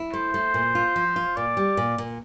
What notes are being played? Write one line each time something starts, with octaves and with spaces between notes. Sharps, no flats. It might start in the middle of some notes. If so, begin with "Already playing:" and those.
Already playing: E4
A3 C5
A3
A#2
F4
F3
F4
A#2 D5
G3
A#2
A#2